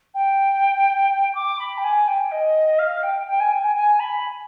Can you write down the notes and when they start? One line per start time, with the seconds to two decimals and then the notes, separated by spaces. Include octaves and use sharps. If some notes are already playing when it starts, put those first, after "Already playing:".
0.14 G5
1.35 D6
1.59 B5
1.78 G5
1.84 G#5
2.08 G5
2.32 D#5
2.79 F5
3.03 G5
3.27 G5
3.40 G#5
3.52 G5
3.64 G#5
3.76 G#5
4.00 B5